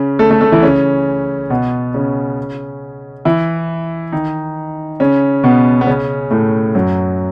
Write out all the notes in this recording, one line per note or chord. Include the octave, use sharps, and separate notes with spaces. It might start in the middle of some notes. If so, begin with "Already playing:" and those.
Already playing: C#3 C#4
A3 A4
A3 A4
A3 A4
E3 E4
C#3 C#4
B2 B3
C#3 C#4
E3 E4
D#3 D#4
C#3 C#4
B2 B3
B3
C#3 C#4
A2 A3
F#2 F#3